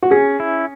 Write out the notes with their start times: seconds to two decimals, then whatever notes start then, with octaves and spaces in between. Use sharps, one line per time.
0.02 F#4
0.11 C#4 G#4
0.40 E4